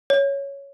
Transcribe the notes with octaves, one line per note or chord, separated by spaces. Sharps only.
C#5